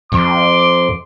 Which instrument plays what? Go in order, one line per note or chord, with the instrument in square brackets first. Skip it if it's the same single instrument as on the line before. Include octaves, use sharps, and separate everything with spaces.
[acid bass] F2 [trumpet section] C6 D6